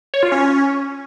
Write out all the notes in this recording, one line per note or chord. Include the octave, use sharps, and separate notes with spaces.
C#5
F4
C#4